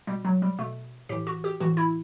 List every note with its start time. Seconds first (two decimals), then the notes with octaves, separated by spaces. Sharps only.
0.07 B2 G3
0.25 F#3
0.42 G3
0.59 B2 A3
1.09 A2 E3 G4
1.27 F#4
1.44 G4
1.60 A2 E3 F#4
1.77 E4